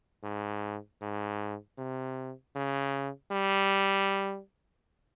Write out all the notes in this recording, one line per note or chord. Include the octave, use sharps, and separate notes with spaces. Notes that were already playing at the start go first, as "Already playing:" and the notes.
G#2
G#2
C3
C#3
G3